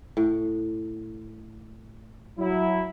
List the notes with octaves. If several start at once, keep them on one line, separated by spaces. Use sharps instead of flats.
A2
F#3 E4